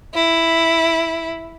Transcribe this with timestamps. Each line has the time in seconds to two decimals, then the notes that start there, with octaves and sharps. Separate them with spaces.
0.14 E4